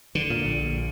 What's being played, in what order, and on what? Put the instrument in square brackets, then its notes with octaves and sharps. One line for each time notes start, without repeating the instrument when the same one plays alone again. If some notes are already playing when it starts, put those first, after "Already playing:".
[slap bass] D3
[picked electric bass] A#2
A#1